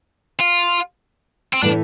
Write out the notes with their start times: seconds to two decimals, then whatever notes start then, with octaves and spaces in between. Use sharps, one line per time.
0.40 F4
1.53 C4
1.62 A2 E3 A3 D4